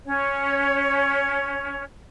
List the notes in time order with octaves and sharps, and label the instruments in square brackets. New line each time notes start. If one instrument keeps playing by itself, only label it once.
[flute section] C#4 C#5